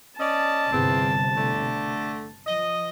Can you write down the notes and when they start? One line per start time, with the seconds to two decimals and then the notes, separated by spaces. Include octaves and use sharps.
0.20 C#4 D5 D#5 A5
0.72 G1 E2 C3 C4
1.36 D3 A3
2.46 F3 D#5